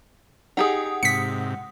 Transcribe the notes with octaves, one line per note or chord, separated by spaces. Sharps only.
D#4 G4 G#4 F#5 D#6
G#2 C3 B6 C#7